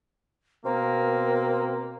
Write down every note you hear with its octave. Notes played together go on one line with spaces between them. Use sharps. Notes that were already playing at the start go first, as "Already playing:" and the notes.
B2 A#3 C4 A#4